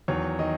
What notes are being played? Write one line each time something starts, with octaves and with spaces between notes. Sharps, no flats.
E2 D#3 F#3 C#5
D#3 F#3 D#5